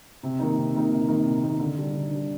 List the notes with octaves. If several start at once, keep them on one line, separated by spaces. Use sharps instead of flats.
C3
D#3 A#3 D#4
C3
D#3 A#3 D#4
C3
D#3 A#3 D#4
C3
D#3 A#3 D#4
D3
G3 D4
D3
G3 D4